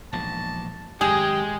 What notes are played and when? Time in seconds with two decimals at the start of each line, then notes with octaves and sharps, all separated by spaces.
0.13 E1 A#1 G#2 A5
1.01 G#1 F#2 G#3 G4 G#4